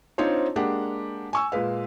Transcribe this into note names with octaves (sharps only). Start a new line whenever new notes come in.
C4 D4 D#4 F4 C5 C#5
G#3 A#3 D4 G4 F#5
G#5 C#6 E6
A#2 G#3 B4 F5